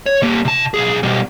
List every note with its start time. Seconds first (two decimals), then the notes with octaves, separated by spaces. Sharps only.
0.06 C#5
0.22 G3 A#3
0.45 C3 A5
0.74 B1 G#4
1.03 B2 G3